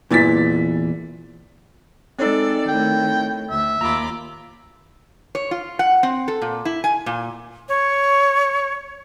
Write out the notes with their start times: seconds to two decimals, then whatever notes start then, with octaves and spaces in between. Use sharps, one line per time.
0.11 E2 A#2 E3 A6 B6
2.19 G#3 C4 D#4 A4 D5
2.68 A2 D#3 G5
3.50 D2 E5
3.81 D#2 F4 A#5 B5 D6
5.35 C#5
5.51 F4
5.79 F#5
6.03 C4
6.28 A4
6.42 A#2
6.65 E4
6.84 G#5
7.06 A#2
7.69 C#5